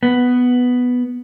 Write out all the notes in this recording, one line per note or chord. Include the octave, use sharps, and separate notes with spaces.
B3